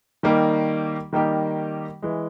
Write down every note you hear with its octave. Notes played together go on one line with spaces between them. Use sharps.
D#3 G3 A#3 D#4 G4
D#3 G3 A#3 D#4 G4
E3 G#3